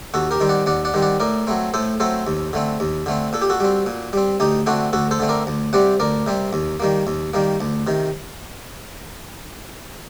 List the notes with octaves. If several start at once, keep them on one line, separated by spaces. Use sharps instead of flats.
D#2 F#4 A4
G4 A#4
D#3 G3 C4
D5 F#5
D#2 D5 F#5
D5 F#5
D#3 G3 C4
D5 F#5
A2 A#4 D5
F#3 A3 C4
A2 A4 C5
F#3 A3 C4 A4 C5
D#2
D3 A3 C4
D#2
D3 A3 C4
A#2 A4
G4
F#4 A4
G3 C4
A#2
G3 C4
D2 D#4 G4
D3 A3 C4 D4 F#4
D2 F#4 A4
A4 C5
D3 A3 C4
A#4 D5
D2
C3 G3 C4 D5 F#5
D2 A#4 D5
C3 G3 C4
D#2
D#3 G3 A#3
D#2
D#3 G3 A#3
D2
C3 D#3